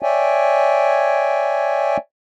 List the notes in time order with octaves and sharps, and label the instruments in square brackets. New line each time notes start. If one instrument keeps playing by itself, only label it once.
[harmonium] C#5 D5 E5 G5 G#5